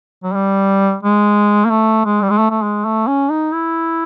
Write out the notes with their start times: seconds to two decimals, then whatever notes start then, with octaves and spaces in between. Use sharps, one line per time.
0.24 F#3
0.34 G3
1.03 G#3
1.65 A#3
1.70 A3
2.05 G#3
2.22 G3
2.30 G#3
2.38 A3
2.50 A3
2.62 G#3
2.85 A3
3.07 C#4
3.30 D#4
3.53 E4